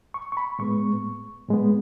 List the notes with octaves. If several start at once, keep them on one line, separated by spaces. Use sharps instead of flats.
C#6
C#6
B5
A2 G#3 B3 C#6
A2 G#3 B3